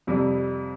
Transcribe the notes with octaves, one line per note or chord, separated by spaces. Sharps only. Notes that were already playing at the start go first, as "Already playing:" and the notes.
F2 C3 G3